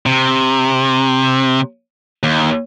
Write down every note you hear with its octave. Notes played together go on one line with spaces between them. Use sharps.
C3
D#2